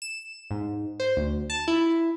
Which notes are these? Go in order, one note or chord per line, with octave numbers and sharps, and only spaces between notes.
E7
G#2
C5
D2
A5
E4